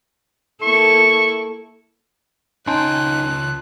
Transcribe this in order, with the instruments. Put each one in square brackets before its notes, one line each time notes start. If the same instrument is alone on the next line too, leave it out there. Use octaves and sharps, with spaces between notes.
[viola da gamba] A#3 E4 A4 [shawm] C#6
[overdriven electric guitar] C#2 G5 [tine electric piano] C#4 D#4 [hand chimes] A5 C6 [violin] F#6